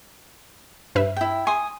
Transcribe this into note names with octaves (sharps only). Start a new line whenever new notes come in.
G2 B4 E5
E4 G5
G#5 C6 D#6